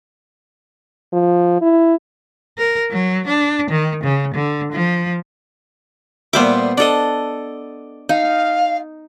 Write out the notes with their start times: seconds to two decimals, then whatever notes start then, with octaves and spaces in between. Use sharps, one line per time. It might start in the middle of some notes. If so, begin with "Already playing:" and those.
1.13 F3
1.61 E4
2.58 A#4
2.91 F#3
3.27 D4
3.71 D#3
4.04 C#3
4.34 D3
4.73 F3
6.33 A#2 G3 B3 C5 E5 D6
6.78 D4 A4 D5 D#5
8.09 D#4 F5